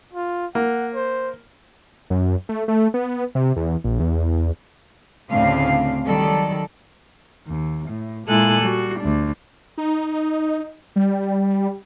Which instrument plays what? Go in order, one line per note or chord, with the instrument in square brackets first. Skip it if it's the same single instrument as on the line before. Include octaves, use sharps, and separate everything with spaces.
[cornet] F4
[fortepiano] A#3 [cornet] F#5
[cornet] C5
[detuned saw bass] F#2
A3
A3
B3
C3
E2
A#1
E2
[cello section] D2 A2 C#3 C4 D4 F5
D#3 F#3 G3 A4 D5
[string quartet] D#2
A2
A#2 G#3 E4 A4 G#5 F#6
G3 F#4
D2 D4
[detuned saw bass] D#4
G3